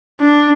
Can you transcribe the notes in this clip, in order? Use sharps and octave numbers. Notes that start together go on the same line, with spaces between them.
D4